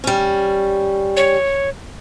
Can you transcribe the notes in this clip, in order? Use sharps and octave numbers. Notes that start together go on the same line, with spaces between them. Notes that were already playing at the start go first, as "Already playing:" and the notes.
G3 C#4
C#5